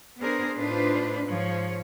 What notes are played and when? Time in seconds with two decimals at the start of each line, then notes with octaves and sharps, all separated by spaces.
0.18 B3 D4 G#4 A#4 C5
0.54 A2 D4 D#4 F4 B4 C5
1.25 G#2 F3 C#5